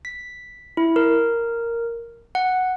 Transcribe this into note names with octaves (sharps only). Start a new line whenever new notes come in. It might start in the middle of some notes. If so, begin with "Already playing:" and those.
B6
E4
A#4
F#5